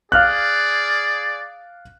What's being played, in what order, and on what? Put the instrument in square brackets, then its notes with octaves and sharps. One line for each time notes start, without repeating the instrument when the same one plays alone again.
[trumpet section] G#4 D5 [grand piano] F5 F6 F#6